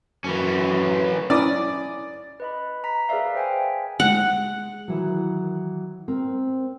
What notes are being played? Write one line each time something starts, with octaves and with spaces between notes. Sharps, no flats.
F#2 E3 C#4
C#4 E4 D5 D#6
B4 D#5 B5
A#5 B6
G#4 A#4 B4 D5 E5 F5
C5 G5 G#5
G#3 F#5
D#3 E3 F#3
C4 A#4